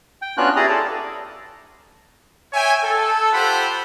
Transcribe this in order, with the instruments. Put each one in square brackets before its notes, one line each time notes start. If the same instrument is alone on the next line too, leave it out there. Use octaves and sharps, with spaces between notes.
[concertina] G5
B3 C#4 D4 F4 F#4 F#6
E4 G4 G#4 D5 A#5 D#6
A4 D5
[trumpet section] C#5 E5 G5 G#5
A4
F4 G4 C5 F#5 B5